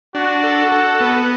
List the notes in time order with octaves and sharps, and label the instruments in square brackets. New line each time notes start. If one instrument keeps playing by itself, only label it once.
[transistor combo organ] D4 [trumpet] F#4
[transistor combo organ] A4
A4
B3